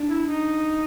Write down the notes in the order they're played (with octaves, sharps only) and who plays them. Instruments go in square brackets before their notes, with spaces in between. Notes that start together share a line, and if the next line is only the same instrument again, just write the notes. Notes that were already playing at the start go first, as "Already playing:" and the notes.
Already playing: [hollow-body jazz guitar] D4
[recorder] E4
D#4